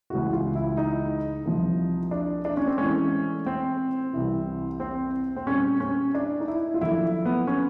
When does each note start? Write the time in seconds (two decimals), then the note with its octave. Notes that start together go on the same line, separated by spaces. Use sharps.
0.10 C#2 C#3 E3 F#4
0.33 F4
0.55 E4
0.77 D#4
1.45 C2 C3 F3
2.11 D4
2.45 D4
2.57 C#4
2.67 C4
2.78 A2 E3 G#3 C#4
3.46 C4
4.13 C2 C3 E3
4.80 C4
5.36 C4
5.47 A#2 G3 C#4
5.80 C#4
6.15 D4
6.40 D#4
6.48 E4
6.74 F4
6.81 F#2 D3 F3 E4
7.25 B3
7.48 C#4